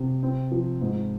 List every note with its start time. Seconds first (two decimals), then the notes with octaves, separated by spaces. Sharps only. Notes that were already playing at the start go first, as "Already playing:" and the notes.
Already playing: C3
0.23 C4
0.51 F3
0.81 G#2